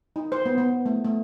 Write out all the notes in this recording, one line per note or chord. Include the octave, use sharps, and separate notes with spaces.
D#4
C5
B3
B3
A3
A3